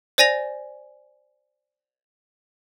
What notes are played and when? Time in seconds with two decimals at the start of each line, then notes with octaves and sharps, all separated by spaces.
0.18 C5 D5 G#5 A#6 F7